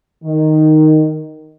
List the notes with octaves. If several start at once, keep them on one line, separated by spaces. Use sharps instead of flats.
D#3